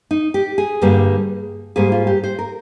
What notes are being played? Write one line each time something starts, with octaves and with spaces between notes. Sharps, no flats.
D#4
G4
G#4
G2 D3 G3 A#3
G#2 G3 A#3 G#4
F4
G4
C5
A#4